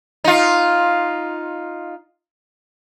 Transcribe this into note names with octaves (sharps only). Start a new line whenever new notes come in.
D#4 F4